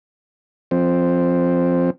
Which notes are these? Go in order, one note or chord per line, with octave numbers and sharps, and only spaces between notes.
F3 C4